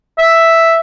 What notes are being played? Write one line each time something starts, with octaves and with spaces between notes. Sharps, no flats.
E5